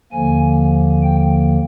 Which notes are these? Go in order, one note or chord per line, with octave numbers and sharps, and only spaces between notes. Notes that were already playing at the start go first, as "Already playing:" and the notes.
D#2 D3 F3 A#3 G#5
G5